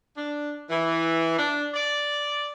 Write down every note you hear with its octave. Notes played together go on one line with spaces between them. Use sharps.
D4
E3
D4
D5